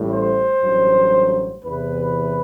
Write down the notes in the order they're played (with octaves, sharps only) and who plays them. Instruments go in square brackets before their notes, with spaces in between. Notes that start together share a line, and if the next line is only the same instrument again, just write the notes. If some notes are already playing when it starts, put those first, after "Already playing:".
Already playing: [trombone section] A1 A2 G3
C5
A1 G2 F#3
E2 C3 E3 B4